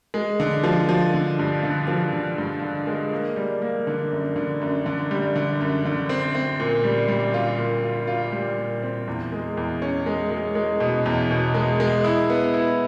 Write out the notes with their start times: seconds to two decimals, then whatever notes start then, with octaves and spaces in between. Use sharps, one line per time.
0.14 G#3
0.40 D3
0.64 F3
0.89 F3
1.14 D3
1.39 G2
1.63 D3
1.88 F3
2.13 D3
2.38 G2
2.62 D3
2.87 G#3
3.12 A#3
3.36 G3
3.62 A#3
3.87 D3
4.12 F#2
4.36 D3
4.61 F#2
4.86 D3
5.11 G3
5.36 D3
5.61 F#2
5.85 D3
6.09 C4
6.35 C4
6.60 A#2
6.84 G3
7.08 G3
7.34 F4
7.58 A#2
7.84 F4
8.07 F4
8.32 G3
8.58 A#2
8.83 C4
9.08 E2
9.32 G#3
9.57 E2
9.82 C#4
10.06 G#3
10.30 G#3
10.55 G#3
10.80 B2
11.06 E2
11.31 B2
11.54 G#3
11.80 G#3
12.04 E4
12.30 B3
12.54 E4